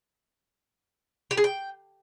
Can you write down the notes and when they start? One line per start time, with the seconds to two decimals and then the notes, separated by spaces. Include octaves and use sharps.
1.31 G4
1.37 G#4
1.44 G5